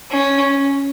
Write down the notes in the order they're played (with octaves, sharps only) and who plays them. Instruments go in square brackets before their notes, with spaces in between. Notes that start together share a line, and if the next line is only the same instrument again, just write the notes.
[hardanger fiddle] C#4